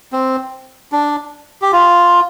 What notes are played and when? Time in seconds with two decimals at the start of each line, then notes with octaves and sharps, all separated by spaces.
0.13 C4
0.92 D4
1.62 G4
1.72 F4